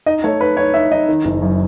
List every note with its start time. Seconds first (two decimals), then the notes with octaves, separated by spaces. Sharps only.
0.06 D#4 D#5
0.24 A3 C#5
0.41 D#4 B4
0.57 D#4 C#5
0.74 D#4 E5
0.91 D#4 D#5
1.08 D#3
1.25 F#1
1.42 F#2